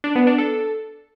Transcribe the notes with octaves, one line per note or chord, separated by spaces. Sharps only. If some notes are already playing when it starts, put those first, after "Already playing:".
D4
B3
D4
A4